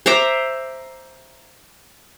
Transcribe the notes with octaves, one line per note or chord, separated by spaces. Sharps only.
C5 E5 A#5 D6